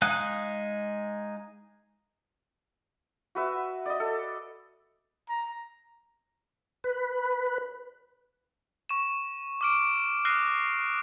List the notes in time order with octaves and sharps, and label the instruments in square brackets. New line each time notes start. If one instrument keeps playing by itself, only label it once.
[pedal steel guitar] G#3 D#4 G#4 F5 F#6
[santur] F#4 B4 E5
D5 D#5
A4
[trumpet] A#5
[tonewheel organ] B4
[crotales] C#6 E7
D6 F6 D7
D#6 F6 F#6 A#6 C7 D#7